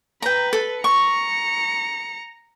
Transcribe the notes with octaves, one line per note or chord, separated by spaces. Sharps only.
B4 G5 A#5
A4
A#5 C#6 C#7